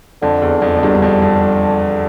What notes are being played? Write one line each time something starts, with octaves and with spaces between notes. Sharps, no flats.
F2 D3
E2
F2
F2
E2 G2
G2
F2
F2